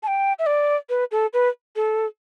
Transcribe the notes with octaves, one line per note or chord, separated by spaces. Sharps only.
A5
G5
E5
D5
B4
A4
B4
A4